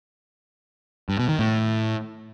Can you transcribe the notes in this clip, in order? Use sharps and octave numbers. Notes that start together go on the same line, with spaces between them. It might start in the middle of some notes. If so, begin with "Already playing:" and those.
G2
B2
D#3
A2